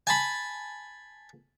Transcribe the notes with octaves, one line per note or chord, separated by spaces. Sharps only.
G#5 A5 B5